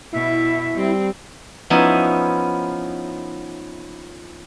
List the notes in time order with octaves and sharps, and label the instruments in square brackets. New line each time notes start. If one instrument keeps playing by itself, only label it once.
[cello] B2 E5 [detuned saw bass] E4
[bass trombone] G3 [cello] C4
[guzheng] F3 B3 C#4 D#4 E4